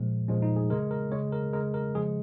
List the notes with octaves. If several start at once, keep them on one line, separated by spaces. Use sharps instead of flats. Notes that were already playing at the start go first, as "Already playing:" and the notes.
Already playing: A#2 F3 G#3
A#2 F3 G#3 C#4
D#4
G#4
C#3 G#3 A#4
A#4
C#3 G#3 C#5
A#4
C#3 G#3 A#4
A#4
C#3 F3 G#3 G#4